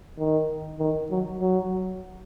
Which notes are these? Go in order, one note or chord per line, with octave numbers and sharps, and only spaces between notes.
D#3
D#3
F#3
F#3